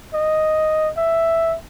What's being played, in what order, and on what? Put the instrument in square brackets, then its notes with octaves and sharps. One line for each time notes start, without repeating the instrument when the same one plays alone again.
[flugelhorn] D#5
E5